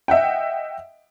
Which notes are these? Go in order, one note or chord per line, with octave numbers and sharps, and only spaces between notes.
D#5 E5 F#5 G5